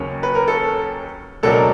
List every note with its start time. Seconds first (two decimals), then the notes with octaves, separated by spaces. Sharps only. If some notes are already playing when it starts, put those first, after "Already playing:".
Already playing: D#2 C#3 F#3 A#3 C#4
0.23 B4
0.35 A#4
0.48 A4
1.43 C#2 B2 F#3 A#3 D4 A4
1.52 A#4